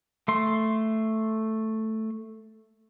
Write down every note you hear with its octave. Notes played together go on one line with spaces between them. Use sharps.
A3 C6